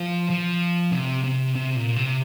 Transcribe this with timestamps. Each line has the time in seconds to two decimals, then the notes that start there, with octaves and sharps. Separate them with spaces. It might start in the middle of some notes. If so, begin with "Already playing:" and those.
Already playing: F3
0.30 F3
0.92 C3
1.24 C3
1.55 C3
1.75 A#2
1.96 C3